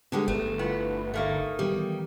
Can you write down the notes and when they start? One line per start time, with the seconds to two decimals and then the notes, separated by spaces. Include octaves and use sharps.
0.12 D3 G3 G#3 B3
0.28 G1 A3
0.59 B3 E4 F4
1.14 D2 G2 A3 A#3 D#4
1.59 D#3 E3 G3 B3